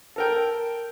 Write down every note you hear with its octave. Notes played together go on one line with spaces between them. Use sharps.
A4 A#4 G5